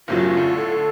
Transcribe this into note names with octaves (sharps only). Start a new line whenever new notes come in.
F#1 A2 F#3 F4
A2 D3
A4